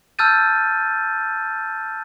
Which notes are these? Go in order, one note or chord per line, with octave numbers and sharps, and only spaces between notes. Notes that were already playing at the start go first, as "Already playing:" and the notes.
A5 E6 F6 G6 A6 D#7